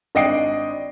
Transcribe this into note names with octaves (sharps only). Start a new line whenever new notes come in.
G#1 D4 D#5 G5 C7 D7